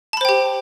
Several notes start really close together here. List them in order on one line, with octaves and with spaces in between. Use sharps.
A5 B5 C5 G5 G4